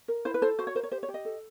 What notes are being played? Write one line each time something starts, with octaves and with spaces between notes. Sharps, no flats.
A#4
E4 C5
B4
A4 C5
F#4 C5
C#5
A#4 C5
C#5
G4 C5
C#5
G4
D#5
A4